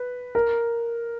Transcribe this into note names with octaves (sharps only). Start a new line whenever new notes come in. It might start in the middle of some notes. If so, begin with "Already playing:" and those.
Already playing: B4
A#4